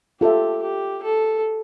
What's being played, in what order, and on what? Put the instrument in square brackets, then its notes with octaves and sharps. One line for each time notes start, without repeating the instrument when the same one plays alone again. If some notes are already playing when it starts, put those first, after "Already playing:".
[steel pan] F4 A4 E5 [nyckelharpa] G4
[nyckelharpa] G4
A4